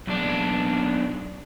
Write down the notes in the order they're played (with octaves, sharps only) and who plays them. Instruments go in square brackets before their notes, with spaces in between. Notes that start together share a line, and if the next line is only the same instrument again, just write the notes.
[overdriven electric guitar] B1 D4